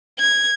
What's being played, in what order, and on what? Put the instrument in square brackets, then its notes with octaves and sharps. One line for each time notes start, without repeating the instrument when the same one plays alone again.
[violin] G#6